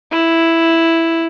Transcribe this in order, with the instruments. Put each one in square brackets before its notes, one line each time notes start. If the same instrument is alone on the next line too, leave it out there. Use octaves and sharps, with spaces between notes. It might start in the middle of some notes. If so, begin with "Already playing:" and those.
[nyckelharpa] E4